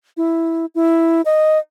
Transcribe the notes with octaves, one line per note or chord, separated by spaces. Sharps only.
E4
E4
D#5